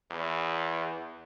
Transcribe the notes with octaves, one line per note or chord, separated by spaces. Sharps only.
E2